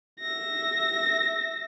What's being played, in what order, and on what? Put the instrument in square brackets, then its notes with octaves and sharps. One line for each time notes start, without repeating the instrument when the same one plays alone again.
[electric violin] E5 A#6